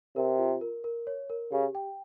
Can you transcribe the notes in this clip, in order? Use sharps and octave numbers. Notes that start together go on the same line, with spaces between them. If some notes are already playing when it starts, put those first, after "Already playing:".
C3 A#4
F4
A#4
A#4
C#5
A#4
C#3 G4
G5